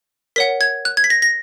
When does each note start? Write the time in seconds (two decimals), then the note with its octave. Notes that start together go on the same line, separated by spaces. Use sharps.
0.36 A#4 C#5 F#5 B6
0.61 G#6
0.85 F#6
0.97 G#6
1.04 B6
1.10 A#6
1.22 A#6